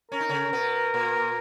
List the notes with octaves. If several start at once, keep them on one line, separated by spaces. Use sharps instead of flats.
C#4 A#4
D#4
C#3 C#4
B2 B3
A#2 A#3